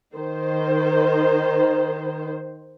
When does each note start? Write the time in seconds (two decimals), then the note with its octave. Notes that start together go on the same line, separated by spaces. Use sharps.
0.14 D#3 C5